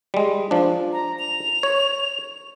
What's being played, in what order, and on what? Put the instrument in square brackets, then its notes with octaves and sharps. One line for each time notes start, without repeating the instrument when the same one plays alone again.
[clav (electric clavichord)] G3 G#3
F3 D4
[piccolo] A#5
F7
[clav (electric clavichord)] C#5